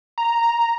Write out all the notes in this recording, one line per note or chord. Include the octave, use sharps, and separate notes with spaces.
A#5